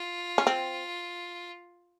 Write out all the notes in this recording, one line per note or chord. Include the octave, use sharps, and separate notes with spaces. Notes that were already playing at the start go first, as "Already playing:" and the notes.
Already playing: F4
C#4
C4